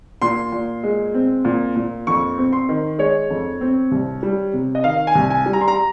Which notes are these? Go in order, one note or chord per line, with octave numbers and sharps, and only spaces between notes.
A#2 C6
A#2
G#3
C4
A#2
A#2
F2 C#6
C4
C6
D#3
G#3 C#5
F2
C4
C2
G3
C3
D#5
D#3 F5
G#5
C2
G#5
G3
A#5
C6
A#5